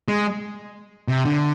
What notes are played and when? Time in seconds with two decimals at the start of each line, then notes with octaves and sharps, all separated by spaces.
0.08 G#3
1.08 C3
1.25 D3